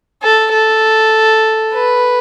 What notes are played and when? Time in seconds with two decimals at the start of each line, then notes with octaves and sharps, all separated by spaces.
0.23 A4
0.53 A4
1.74 B4